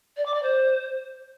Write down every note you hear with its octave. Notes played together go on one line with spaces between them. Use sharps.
D5
D6
D5
C5